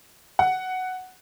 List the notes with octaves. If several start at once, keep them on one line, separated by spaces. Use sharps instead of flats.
F#5